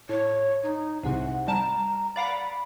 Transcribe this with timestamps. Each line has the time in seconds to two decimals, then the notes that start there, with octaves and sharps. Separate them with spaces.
0.09 A2 C#5
0.63 D#4
1.03 C2 G#2 C3 F#5
1.48 G3 A5 A#5 E7
2.16 D5 F5 F#5 B5